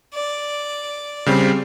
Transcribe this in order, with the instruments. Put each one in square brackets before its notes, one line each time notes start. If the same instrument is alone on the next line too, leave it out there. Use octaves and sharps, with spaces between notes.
[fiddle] D5
[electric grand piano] C#3 G3 C4